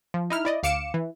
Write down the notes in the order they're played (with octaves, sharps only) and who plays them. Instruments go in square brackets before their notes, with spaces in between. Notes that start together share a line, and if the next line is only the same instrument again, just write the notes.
[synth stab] F3
D#4 E4 F6
E4 D5 D#5
D2 F5 D6 C#7 E7
E3